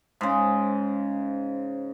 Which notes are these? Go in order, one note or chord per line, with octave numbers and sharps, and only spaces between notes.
G#2 C#3